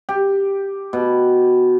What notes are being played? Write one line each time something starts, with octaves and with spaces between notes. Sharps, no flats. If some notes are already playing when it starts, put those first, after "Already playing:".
G4
B2